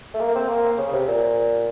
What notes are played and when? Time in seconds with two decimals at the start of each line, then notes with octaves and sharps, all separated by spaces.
0.14 A3
0.20 A#3
0.35 C4
0.49 A#3
0.78 C#3
0.93 C3
1.08 A#2